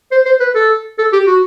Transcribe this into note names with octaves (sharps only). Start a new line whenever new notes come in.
C5
C5
B4
A4
A4
G4
F#4